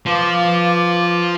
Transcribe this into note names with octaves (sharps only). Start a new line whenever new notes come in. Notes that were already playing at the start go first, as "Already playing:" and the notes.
F3 B4 F5 D6